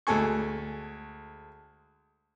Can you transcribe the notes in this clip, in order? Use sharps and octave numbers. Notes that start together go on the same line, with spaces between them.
D2 G#3 A4 G#5 C#6